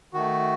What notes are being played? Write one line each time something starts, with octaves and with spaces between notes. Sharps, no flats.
D#3 A3 F#4